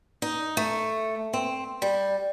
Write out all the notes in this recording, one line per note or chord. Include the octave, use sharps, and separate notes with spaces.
D#4
A3
C4
G3